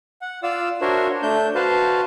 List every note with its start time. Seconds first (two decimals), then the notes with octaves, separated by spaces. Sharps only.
0.22 F#5
0.43 F4 D5 F5 E6
0.81 D4 F#4 A#4 C5 C#5 E5
1.22 A3 D4 G6
1.55 F#4 B4 C5 F5 A5